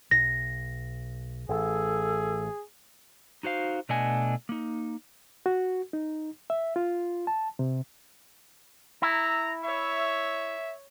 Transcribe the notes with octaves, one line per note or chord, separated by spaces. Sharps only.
B1 A#6
A1 G#4 A4
D#4 F#4 C5 F5
B2 A3 D4 D#5 F#5 G#5
A#3 D#4
F#4
D#4
E5
F4
A5
C3
E4 A#5
C#5 E5